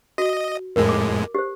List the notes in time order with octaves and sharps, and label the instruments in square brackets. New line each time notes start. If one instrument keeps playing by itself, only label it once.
[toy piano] F#4 [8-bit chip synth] D#5
[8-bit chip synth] F2 A2 G#3 [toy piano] A#4
[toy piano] D6
G4 C5